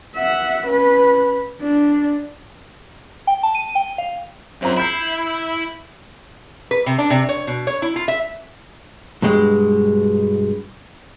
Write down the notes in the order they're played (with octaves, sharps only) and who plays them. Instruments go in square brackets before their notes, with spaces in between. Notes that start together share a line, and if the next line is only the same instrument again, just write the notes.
[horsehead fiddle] E5 F#5
C#4 B4
D4
[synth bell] G5
A5
D#7
G5
F5
[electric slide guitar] F#2 [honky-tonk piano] C4 F4 A#5
[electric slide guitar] E4 [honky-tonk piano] B5 G6 C7
[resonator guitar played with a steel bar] B4
C3
D4
C3
C#5
B2
C#5
E4
F4
E5
[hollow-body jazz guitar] G2 B2 G#3